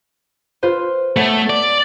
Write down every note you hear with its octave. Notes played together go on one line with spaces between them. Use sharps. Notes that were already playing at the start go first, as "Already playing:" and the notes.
F4 B4 C5
A3 B3 C#5
D5